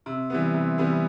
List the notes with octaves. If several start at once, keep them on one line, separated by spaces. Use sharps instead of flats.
C3
E3 G3 B3
C3
E3 G3 B3